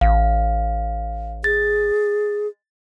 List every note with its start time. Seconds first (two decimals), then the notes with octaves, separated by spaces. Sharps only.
0.01 A1 F5
1.44 G#4 A6